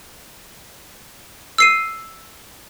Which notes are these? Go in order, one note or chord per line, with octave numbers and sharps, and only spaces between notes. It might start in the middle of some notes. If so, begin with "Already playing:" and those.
E6 C7 D#7